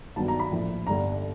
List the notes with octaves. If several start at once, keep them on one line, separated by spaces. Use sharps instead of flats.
G1 G2 D#3 F#3 B3 A5
A#5
B5
A#1 A2 F3
G1 G2 D3 G3 A#5